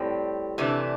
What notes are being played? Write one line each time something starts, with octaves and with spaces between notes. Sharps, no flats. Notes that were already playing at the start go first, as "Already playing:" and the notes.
Already playing: A2 G3 C4
C3 E3 A3 D4